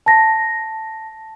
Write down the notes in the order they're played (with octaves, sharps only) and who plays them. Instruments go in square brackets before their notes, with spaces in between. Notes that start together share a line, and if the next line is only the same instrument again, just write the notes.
[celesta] A5 A#6